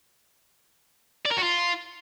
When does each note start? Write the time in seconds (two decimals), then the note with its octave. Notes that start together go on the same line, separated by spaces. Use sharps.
1.25 D5
1.31 A#4
1.37 F#4
1.43 F4